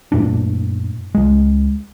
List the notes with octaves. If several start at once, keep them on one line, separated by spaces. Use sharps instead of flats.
F#2 A#2 A3 D4
C#2 G#3